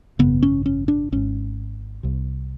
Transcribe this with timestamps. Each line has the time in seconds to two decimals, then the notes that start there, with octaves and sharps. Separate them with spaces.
0.19 G#1 F#2 C#3 B3
0.43 C#4
0.66 C#4
0.88 D4
1.12 G#1 G#2 C#4
2.03 C2 C3